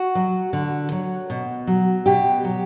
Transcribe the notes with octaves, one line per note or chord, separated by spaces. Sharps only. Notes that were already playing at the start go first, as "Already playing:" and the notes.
Already playing: F#4
F#3
D3
F#3
B2
F#3
B2 G4
F#3